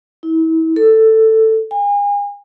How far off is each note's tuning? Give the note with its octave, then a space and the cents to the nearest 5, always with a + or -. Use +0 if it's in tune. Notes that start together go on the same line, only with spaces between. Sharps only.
E4 -35
A4 +10
G#5 -35